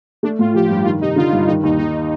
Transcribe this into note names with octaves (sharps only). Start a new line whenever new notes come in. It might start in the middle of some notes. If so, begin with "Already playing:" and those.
A3 D4
A2 F4
F3 G4
G2 G4
D#3 F4
C3 D#4
D3 F4
G2
D#3 D#4
D#2 D#4
D#3 D#4